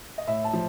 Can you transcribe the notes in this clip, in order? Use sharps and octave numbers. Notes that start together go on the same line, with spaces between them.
D#5
A2 E5
A5
F3